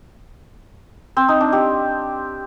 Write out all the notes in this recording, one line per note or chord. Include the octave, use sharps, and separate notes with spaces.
C4
D#4
D4
G4